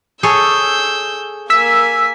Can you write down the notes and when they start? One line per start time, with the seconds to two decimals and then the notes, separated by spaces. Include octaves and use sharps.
0.23 G#4 A4 C#5 E6 G6
1.50 A#3 G#5 E6 B6